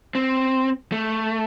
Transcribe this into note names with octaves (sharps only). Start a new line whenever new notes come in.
C4
A3